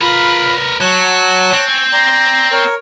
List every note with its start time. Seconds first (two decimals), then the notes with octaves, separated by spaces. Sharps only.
0.02 F4 A#4 B4 B5
0.81 F#3 C#5 A5 F#6
1.53 C4
1.68 G#5 C#6
1.93 D5 A#5 C6
2.52 A#4 C#5